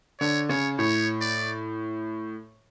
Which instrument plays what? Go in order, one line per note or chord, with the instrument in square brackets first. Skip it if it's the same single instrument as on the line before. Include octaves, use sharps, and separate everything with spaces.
[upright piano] D3 [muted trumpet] C#5
[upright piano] C#3 [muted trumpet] C#5
[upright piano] A2 [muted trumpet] C#5
[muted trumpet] D5